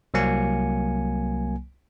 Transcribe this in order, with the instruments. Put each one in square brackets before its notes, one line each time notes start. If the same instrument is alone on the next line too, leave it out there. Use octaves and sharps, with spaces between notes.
[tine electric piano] C2 F#3 A#3 G#5 C#7